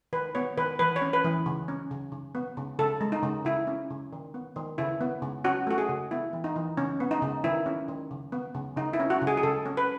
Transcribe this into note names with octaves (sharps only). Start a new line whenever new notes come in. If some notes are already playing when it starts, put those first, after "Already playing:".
D#3 B4
B3 C#5
D#3 B4
E3 B4
C#5
C#4
B4
E3
C#3
C#4
C#3
C#3
B3
C#3
C#3 A4
G#3
D#4
C#3
C#3 E4
C#4
C#3
D#3
B3
D#3
C#3 E4
B3
C#3
C#4 F#4
A3 F#4
G#4
C#3
B3 E4
E3
D#4
E3
C#3 C#4
B3
D#4
C#3
D#3 E4
C#4
D#3
C#3
B3
C#3
C#3 D#4
E4
C#4
F#4
C#3
G#4
G#4
C#3 A4
C#4
B4